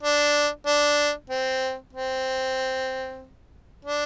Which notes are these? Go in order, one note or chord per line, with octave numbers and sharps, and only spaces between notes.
D4
D4
C4
C4
D4